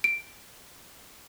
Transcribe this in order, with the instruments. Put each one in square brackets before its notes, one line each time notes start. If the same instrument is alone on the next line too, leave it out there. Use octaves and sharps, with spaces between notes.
[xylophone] D7